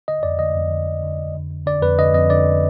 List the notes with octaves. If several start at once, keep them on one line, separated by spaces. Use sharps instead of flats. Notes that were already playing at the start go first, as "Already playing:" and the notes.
D3 D#5
F2 D5
D3 D#5
F2
D3
F2
D3
F2
D3
F2
D3 D5
F2 B4
D3 D#5
F2 D#5
D3 D5